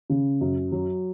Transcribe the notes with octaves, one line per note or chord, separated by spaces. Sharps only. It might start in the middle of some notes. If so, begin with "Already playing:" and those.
C#3
F#2
F#3